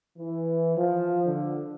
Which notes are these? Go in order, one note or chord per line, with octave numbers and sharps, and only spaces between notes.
E3
F3
D3